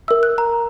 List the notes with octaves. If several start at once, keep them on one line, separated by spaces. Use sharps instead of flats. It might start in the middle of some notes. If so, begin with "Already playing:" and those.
A#4 E5 E6
F#6
A#5